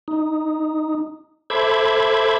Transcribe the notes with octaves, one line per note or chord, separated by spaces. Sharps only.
D#4
A4 C5 E5 B5 D6 G#6